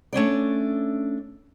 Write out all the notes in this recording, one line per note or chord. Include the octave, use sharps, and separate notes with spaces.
A3 C#4 D4 D5